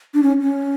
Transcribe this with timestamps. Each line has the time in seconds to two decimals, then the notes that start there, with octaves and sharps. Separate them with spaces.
0.14 D4
0.23 C#4
0.42 C#4